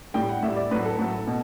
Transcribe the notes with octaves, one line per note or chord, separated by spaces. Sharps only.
A2 G3 G5
F#5
A2 G3 E5
D5
A2 F#3 B4
A4
A2 F#3
B2